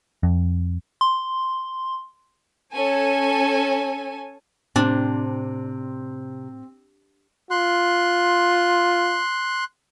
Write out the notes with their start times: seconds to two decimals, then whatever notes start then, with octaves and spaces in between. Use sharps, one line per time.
0.23 F2
1.01 C6
2.73 C#4 A4 G#5
4.76 A2 C3 C4 D4
7.51 F4 C6 F#6